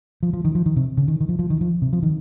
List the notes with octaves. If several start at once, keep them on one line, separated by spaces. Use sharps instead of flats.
F3
F3
D#3
F3
D#3
C3
C#3
D#3
D#3
F3
F3
D#3
F3
C3
F3
D#3